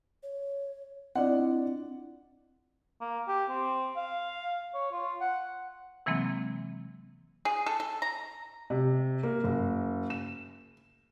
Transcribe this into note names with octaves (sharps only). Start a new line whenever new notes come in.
C#5
C4 D4 E4 F4 D5 D#5 F#5
A#3
G4
C4
F5
C#5
F4
F#5
C3 E3 F#3 G#3 A#3 C4
G#4
A4
A4
A#5
C3
A#3
F#1
E7